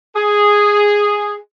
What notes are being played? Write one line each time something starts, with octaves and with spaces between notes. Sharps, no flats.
G#4